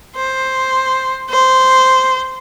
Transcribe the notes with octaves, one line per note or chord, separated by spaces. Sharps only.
C5
C5